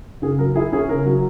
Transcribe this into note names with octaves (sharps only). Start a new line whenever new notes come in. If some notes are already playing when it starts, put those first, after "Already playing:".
C#3 G#4
F#3 A#4
E4 G#4
C#4 G#4
C#3 A#4
F#3